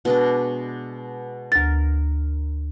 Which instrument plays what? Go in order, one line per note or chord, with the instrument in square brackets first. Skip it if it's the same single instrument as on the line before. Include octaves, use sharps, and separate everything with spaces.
[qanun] B2 G#3 D4
[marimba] D2 A6 [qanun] A#4